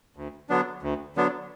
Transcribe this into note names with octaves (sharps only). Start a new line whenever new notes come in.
D2
D3 F#3 B3 D4
D2
D3 F#3 B3 D4